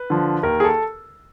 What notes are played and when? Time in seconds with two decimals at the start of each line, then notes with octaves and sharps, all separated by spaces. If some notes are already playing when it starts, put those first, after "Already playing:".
Already playing: B4
0.10 D3 F3
0.43 D#2 A#4
0.60 G#4
0.64 A4